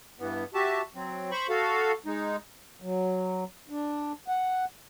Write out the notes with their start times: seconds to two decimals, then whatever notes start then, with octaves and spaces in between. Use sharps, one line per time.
0.19 G2 E3 B3
0.54 F#4 G4 E5 A5
0.95 F#3 C4
1.31 C5 B5 C#6
1.49 F#4 A4 F5
2.06 G#3 D#4
2.82 F#3
3.70 D4
4.28 F#5